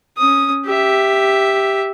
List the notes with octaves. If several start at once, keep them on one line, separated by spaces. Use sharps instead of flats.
C#4 D#6
G4 E5